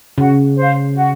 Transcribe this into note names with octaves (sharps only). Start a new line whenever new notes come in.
C#3 F#4
C5 F5
F#4